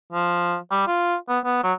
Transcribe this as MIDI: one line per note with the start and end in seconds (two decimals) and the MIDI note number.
0.13 0.56 53
0.71 0.83 55
0.87 1.15 65
1.29 1.39 59
1.45 1.63 59
1.64 1.73 54